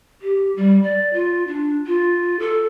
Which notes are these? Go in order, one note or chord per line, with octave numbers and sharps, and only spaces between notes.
G4
G3
D5
F4
D4
F4
A4